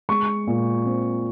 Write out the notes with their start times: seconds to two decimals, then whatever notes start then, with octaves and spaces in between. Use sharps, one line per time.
0.09 G#3 C#6
0.47 A#2
0.86 C4